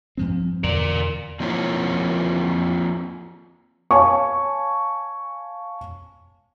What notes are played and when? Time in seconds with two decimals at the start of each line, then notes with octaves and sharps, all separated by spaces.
0.17 G2 F3 C4
0.64 E2 D3 A#4 D5
1.40 F3 A#3 C4 E4 F4 C#5
3.91 C#5 F5 G#5 A5 C#6